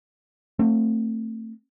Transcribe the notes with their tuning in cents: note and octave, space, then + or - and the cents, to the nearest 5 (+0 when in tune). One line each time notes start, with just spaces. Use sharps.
A3 +30 C4 +35